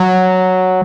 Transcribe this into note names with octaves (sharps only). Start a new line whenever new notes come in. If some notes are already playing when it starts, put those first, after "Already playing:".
Already playing: F#3